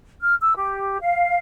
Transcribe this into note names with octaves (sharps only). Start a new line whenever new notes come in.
F6
E6
G4
F5